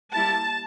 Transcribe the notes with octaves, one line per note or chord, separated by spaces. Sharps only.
G3 A#3 E4 A5